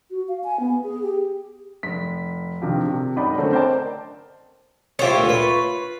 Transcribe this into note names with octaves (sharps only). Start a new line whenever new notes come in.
F#4
F5
G#5
B3
G#4
G4
F1 B6
G2 C3 D#3 F3
C3
C#2 F#2 D#4 D5 D#5 B5
D3 A3 C4 C#4
A#4 C5 D5 D#5 G5 A5
E4 F4 G4 C5 C#5
D2 A#2
B4